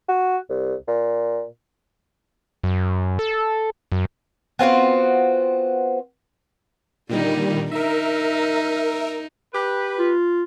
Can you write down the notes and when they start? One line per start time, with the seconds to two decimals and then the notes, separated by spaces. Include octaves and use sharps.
0.09 F#4
0.50 C2
0.88 A#2
2.63 F#2
3.19 A4
3.92 F#2
4.59 B3 C4 F4 F#4
7.09 A#2 D3 D#3 G3 D#4
7.72 D#4 A#4 E5
9.54 G4 B4
9.98 F4